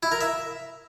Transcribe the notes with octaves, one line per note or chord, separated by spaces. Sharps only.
E4
A#4
E5